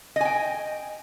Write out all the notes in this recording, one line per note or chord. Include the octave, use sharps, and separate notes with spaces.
D#5 G5 G#5